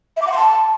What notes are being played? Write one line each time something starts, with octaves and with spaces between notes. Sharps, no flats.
E5
D6
F#5
C6
A5